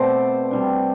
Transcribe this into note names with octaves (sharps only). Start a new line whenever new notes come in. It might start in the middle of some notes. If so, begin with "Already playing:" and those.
Already playing: B2 A3 C4 C5 D5
C3 G3 D4